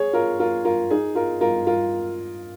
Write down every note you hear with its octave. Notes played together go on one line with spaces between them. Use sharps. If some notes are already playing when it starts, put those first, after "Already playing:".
Already playing: G#4 C#5
F4 A#4
F4 A#4
F4 A#4
D#4 G#4
F4 A#4
F4 A#4
F4 A#4